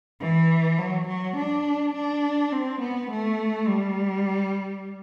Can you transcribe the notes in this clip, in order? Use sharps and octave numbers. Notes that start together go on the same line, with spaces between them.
E3
F#3
F#3
D4
D4
C4
B3
A3
G3